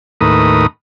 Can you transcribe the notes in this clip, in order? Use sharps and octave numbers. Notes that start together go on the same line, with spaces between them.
D#2 A2 A#4 B4 D#6